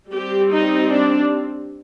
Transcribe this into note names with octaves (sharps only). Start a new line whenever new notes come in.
G3 C4 G4
D#4
D4